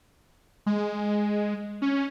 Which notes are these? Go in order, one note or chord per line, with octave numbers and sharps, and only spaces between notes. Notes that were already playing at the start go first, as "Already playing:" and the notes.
G#3
C#4